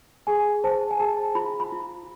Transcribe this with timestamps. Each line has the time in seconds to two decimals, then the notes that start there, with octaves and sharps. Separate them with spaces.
0.27 G#4 G#5
0.64 C5 A5
0.91 G#5
0.99 G#4 A5
1.35 F4 B5
1.60 B5
1.72 F4